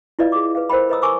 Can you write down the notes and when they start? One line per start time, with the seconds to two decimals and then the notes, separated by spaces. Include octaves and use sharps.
0.19 E4 F4 B4 D5 D#5 F5
0.32 G#4 D6
0.55 B4 F5
0.70 A#4 C5 D#5 G5 B5
0.89 B4 C#5 D#5 A#5 D#6 E6
1.02 A#4 G#5 C#6 D6 E6